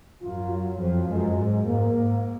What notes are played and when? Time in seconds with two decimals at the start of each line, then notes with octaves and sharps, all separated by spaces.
0.23 F#2 F4
0.51 F#3
0.79 F2 F3
1.08 F#2 G#3
1.37 G#2 G#3
1.65 G#2 A#3
1.94 G#2